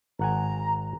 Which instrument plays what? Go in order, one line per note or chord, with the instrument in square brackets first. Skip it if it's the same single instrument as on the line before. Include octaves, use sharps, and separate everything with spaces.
[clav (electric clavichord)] G#1 F#5 G#5 [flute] A#5